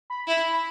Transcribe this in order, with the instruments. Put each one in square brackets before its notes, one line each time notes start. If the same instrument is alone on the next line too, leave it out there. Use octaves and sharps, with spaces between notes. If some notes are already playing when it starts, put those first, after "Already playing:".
[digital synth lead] B5
[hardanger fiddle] E4